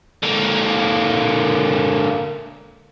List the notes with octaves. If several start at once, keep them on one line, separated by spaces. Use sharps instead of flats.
D3 A#3